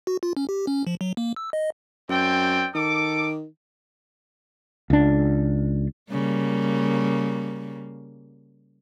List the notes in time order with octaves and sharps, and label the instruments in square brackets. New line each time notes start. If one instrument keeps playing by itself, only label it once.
[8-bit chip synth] F#4
F4
C#4
G4
C#4
F3
F#3
A#3
E6
D#5
[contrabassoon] F#2 [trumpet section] C4 D5 G5
[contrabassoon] D#3 [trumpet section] A4 D6
[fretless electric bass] C#2 D4
[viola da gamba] C#3 G3 A#3